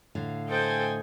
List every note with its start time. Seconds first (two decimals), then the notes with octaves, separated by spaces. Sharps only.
0.15 A2 D3 F5
0.49 A4 C5 D#5 G5 G#5